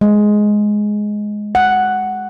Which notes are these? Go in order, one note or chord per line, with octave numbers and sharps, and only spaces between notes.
G#3
F#5